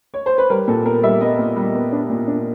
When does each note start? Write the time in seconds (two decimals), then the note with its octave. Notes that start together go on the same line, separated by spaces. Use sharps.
0.14 C#5
0.26 C5
0.38 B4
0.50 G3 A#4
0.68 A#2 A4
0.85 B3 A#4
1.03 G3 E5
1.21 B3 D#5
1.39 A#2
1.56 G3
1.75 B3
1.92 D4
2.10 A#2
2.27 D4